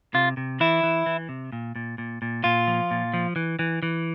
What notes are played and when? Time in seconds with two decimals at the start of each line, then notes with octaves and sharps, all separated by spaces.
0.14 C3 F4
0.37 C3
0.60 E3 E4
0.83 E3
1.06 E3
1.29 C3
1.53 A#2
1.76 A#2
1.98 A#2
2.22 A#2
2.44 A#2 F4
2.67 F3
2.91 A#2
3.14 F3
3.36 E3
3.59 E3
3.83 E3